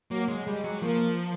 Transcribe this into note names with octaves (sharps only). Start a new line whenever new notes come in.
F#3 A#3
G#3
G3 G#3
F#3
F3 A#3